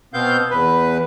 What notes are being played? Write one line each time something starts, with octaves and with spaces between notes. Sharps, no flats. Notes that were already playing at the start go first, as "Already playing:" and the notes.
B2 B3 C4 F5 G6
E2 B4